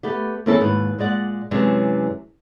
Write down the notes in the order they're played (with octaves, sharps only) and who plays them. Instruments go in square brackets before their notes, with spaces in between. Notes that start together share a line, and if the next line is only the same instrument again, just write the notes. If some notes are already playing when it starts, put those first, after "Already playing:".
[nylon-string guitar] A3 B3 G4
D#2 A#3 C4 C#4 E4 A4
D#2 G#2 B4
A#2 G#3 D5 F#5
F#2 C3 E3 G#3 C#4 D4